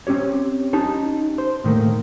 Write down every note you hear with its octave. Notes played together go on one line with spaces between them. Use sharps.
C4 C#4 G4 C#5
C#4 D#4 G4 A5
C5
A2 D#3 A3 A#3